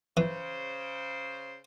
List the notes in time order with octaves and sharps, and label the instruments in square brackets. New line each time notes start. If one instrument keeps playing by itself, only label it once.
[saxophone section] C#3 C5 [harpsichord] E3